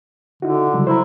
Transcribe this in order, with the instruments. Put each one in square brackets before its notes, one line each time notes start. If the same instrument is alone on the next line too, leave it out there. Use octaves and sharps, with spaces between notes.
[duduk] D3 [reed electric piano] D#4 E4 F#4
[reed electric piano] C#3 F#3 G3
[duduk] E4 [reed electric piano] C5 A#5